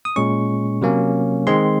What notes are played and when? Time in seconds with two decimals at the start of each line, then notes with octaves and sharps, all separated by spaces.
0.05 D#6
0.16 A#2 G#3 C#4 C#6
0.82 C3 F#3 A#3 C#4
1.47 D#3 G#3 C4 C6